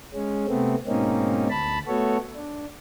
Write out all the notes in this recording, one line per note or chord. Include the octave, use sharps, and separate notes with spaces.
G#3 C#4
C3 A3 B3 C4
G#2 B2 A#3 C4 C#4 D#4
D2 A5 B5
A3 B3 F#4 A4 C#5
D4